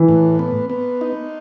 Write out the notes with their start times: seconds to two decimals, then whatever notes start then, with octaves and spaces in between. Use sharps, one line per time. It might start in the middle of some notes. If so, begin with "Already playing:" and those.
Already playing: E3
0.09 A2
0.39 B3
0.70 B3
1.01 D#4